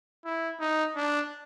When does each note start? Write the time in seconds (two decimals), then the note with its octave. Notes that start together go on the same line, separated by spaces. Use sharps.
0.25 E4
0.60 D#4
0.96 D4